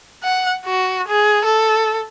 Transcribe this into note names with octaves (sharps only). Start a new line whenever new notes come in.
F#5
F#4
G#4
A4